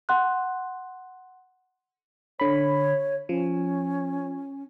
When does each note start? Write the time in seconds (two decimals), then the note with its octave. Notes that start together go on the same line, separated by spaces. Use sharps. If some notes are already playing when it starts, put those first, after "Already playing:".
0.09 F#5 C6 F#6
2.40 D3 C#5 B5
3.29 F3 C#4